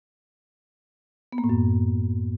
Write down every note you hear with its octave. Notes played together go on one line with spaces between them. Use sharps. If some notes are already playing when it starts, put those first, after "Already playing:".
B3
A#3
A2
F#2